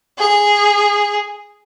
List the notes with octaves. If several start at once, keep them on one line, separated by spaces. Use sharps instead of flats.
G#4